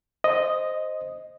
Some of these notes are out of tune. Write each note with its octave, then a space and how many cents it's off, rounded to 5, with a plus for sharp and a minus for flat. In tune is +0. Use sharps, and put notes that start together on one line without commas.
C5 +0 D#5 +0